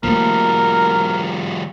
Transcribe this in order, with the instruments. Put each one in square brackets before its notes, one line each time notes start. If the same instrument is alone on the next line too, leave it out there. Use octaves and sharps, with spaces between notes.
[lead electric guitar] F3 G3 [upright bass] A3 A#3 [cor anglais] A#4